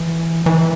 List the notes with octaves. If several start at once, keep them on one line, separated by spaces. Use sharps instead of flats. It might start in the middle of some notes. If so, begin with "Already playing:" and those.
Already playing: E3
E3